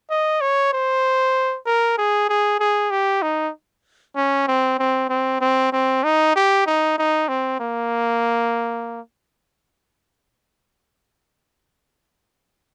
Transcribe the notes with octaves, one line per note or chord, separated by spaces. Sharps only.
D#5
C#5
C5
A#4
G#4
G#4
G#4
G4
D#4
C#4
C4
C4
C4
C4
C4
D#4
G4
D#4
D#4
C4
A#3